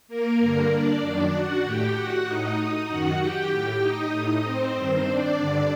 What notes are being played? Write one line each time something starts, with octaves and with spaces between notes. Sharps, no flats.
A#3 A#4
G2 D3
D4 D5
F#2 D#3
F#4 F#5
A2 G4 G5
F#4 F#5
A2 D#4 D#5
F#2 D#3 F#4 F#5
G4 G5
A2
D#4 D#5
A2
C4 C5
G2 D#3
D4 D5
G2 D3